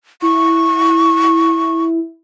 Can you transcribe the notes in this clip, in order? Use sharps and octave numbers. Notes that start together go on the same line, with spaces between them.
E4 C#6